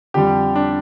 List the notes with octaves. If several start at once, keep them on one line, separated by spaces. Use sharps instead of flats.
F2 D3 G3 G4
D4